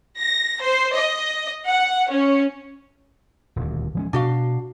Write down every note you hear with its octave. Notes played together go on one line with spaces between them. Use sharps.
A#6
C5
D#5
F#5
C#4
D#1 D2
F3 G#3 C#4
B2 D4 F#4 F5